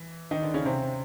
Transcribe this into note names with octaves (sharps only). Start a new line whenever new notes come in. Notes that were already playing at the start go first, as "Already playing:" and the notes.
Already playing: E3
D#3 D#4
D3 D4
C#3 C#4
C3 C4